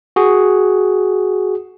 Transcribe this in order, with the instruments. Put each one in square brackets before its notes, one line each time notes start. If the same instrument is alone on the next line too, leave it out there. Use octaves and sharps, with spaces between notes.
[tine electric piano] F#4 G#4